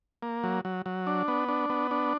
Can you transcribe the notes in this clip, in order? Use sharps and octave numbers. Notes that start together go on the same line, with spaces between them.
A#3
F#3
F#3
F#3
D4
B3
D4
B3
D4